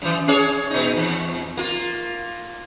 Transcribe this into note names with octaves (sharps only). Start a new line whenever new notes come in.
F#2 E3
C#4 G#4 C#5
A#2 D#4
E2
A#3 F4